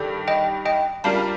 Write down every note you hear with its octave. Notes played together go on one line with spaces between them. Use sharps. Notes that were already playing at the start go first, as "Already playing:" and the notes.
Already playing: G2 D#3 D4 G4 A4
D#5 G5
D#5 G5
G3 D4 F4 A#4 F5 A5